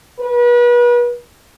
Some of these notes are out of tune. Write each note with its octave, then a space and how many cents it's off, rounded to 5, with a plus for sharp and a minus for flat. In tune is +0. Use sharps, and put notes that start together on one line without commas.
B4 -35